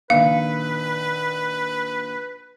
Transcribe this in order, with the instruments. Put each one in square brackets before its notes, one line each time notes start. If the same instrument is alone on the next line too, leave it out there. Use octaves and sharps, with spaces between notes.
[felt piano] A#1 D#3 [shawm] B4 [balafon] F5